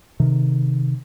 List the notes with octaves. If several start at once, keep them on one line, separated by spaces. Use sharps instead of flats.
C3 D#3